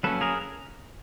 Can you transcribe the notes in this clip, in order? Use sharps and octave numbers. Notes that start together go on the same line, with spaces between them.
F#3 A#3 C#4 A4 B4
G#4 A#4